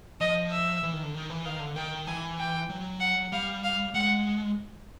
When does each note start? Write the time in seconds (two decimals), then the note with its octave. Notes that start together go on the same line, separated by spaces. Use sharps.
0.21 F3 D#5
0.51 E5
0.83 E3
0.93 D#3
1.03 D3
1.14 D#3
1.30 E3
1.45 D#3 F5
1.60 D3
1.76 D#3 G5
2.07 E3 G#5
2.39 G5
2.69 F#3
3.01 F#5
3.32 G3 F5
3.64 F5
3.94 G#3 F#5